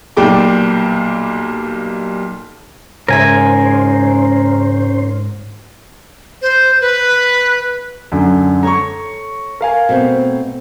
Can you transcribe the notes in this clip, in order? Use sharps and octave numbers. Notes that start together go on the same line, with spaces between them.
B1 A#2 G3 G5 D6
G#2 C#3 C#4 A#4 C5 E5 G#5
C5
B4
F#2 D3
A4 C#5 A#5 C#6
A#4 F5 G#5
B2 A3 C4